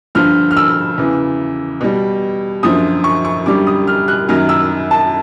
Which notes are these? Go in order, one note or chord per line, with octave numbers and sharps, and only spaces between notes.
G2 D3 F3 F6
F6
E6
E2 C#3 E3
B2 G3
F#2 D3 F3 D#6
C#6
C#6
F#2 D3 G3 D6
D#6
F6
F#6
F#2 D#3 F#3 F6
E6
A5